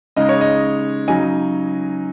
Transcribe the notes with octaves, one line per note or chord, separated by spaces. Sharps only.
C#3 G#3 D#4 D#5
C#5
D#5
C#3 F#3 D#4 G#5